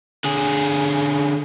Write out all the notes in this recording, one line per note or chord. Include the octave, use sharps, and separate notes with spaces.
D3 G#4